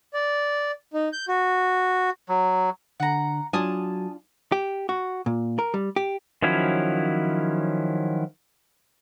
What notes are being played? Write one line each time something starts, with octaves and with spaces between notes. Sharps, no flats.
D5
D#4
G6
F#4
F#3
D3 F#5 A#5
F#3 D4 F4 G#5 A5 D#6
G4
F#4
A#2
A#4
G3
G4
D#3 F3 F#3 C#4 E4